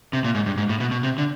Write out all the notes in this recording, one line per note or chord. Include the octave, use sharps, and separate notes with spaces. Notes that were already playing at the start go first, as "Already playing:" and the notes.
C3
A#2
G#2
G2
G#2
A2
B2
B2
C3
D3